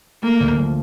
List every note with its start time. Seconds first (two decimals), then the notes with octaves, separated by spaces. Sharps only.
0.22 A3 A#3
0.40 D2
0.58 F3